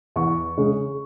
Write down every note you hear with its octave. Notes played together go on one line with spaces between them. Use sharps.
E2 C#6
C#3 G#3